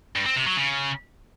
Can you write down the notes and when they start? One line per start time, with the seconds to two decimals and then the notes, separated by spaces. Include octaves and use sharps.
0.16 G2
0.26 C4
0.36 C3
0.46 F#3
0.57 C#3